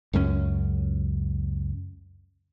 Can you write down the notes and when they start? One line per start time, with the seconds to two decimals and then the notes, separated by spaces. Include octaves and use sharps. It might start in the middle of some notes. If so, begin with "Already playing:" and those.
0.13 C#2 F#2 F3 C#4